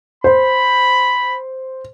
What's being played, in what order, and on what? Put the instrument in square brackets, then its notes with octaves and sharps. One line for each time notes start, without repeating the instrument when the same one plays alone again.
[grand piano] C5 [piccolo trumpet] B5